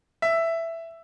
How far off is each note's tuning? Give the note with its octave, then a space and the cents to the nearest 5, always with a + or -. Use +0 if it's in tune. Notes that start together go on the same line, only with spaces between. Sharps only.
E5 +5